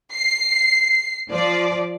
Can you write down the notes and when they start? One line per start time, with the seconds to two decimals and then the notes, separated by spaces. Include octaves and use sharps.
0.12 C7
1.30 F3 D5